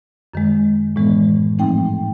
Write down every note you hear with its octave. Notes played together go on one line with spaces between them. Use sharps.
F#2 D#3 G#3
A2 E3 G#3 B3
G#2 F3 A3 C4 D#4 G5